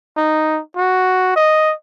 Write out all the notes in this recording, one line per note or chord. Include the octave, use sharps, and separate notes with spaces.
D#4
F#4
D#5